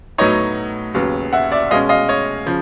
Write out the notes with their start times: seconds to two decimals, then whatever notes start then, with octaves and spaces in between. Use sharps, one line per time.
0.18 A2 F#3 B3 D#4 C#5 D#5
0.94 D#2 C#3 F#3 B3
1.33 E5 F#5
1.52 D5 E5
1.71 B2 G#3 C#4 D#5 F5
1.89 D#5 F5
2.09 C#5 D#5
2.46 C#3 F3